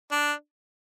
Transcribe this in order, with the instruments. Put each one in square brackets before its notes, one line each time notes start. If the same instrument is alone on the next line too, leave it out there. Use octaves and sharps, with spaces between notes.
[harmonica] D4